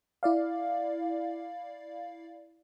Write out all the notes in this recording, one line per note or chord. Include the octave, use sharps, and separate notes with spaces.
E4 D5 F5